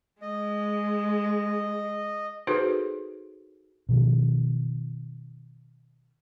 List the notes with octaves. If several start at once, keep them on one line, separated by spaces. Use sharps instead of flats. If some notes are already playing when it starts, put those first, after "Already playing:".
G#3 D#5
D#4 F#4 G#4 A4 B4 C5
B2 D#3 F3